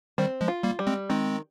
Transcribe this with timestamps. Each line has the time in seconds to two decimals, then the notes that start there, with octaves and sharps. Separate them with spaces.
0.18 D#3 G3 C4
0.41 F3 G#3
0.48 F4
0.63 G3 A#3
0.79 G3
0.87 G#3 C4
1.09 D#3 G#3 C4